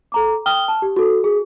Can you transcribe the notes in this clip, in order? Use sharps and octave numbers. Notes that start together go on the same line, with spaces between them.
A4 A#5 D6
G5 D#6 F6 G7
A5
G4
F#4 A4
G#4